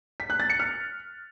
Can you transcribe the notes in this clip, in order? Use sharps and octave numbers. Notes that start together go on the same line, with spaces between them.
B6
F#6
A6
C#7
F6